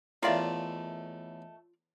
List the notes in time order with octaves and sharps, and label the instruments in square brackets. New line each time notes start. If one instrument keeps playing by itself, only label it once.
[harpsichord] E2 A2 [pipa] D#3 A3 [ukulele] F4 D5 F5